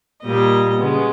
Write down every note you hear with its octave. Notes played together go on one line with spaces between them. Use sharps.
A#2 G3 A#3 D#5
C#3 G#3 B3